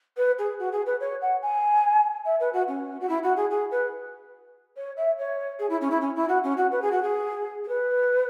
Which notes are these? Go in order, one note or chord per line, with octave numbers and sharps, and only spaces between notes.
B4
G#4
F#4
G#4
B4
C#5
F#5
G#5
E5
B4
F#4
C#4
F#4
E4
F#4
G#4
G#4
B4
C#5
E5
C#5
G#4
E4
C#4
E4
C#4
E4
F#4
C#4
F#4
B4
G#4
F#4
G#4
G#4
B4